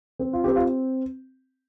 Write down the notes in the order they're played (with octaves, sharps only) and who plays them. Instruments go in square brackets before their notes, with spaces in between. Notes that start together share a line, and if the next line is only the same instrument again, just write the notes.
[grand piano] C4
F4
C4 G4
F4